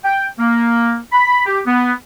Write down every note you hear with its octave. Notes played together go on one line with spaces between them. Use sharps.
G5
A#3
B5
G4
B3